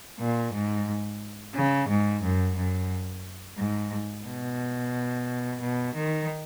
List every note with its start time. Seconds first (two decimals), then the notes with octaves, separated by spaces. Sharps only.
0.20 A#2
0.54 G#2
1.55 C#3
1.89 G#2
2.23 F#2
2.56 F#2
3.58 G#2
4.26 B2
5.61 B2
5.95 D#3